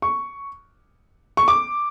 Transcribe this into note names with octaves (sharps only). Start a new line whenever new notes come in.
C#6
C#6
D6